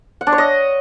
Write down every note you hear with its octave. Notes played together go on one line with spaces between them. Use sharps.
F#5
D4
C#5
D#5